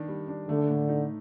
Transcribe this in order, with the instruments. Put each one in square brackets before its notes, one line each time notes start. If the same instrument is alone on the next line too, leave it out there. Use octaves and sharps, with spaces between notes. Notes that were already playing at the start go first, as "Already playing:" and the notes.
Already playing: [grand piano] D#3 D4
G3
D4
[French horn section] D3 [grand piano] A3
[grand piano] A2
D#4